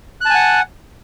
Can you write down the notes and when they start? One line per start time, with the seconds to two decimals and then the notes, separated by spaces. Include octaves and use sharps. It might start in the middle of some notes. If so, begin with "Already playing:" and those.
0.21 F#6
0.26 A5
0.30 G#5
0.35 F#5